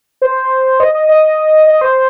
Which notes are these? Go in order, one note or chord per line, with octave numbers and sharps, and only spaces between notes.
C5
D#5
D#5
D#5
D#5
C5